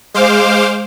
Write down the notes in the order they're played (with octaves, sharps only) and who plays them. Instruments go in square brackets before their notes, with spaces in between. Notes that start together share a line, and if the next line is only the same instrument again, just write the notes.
[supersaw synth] G#3 C5 F5 D6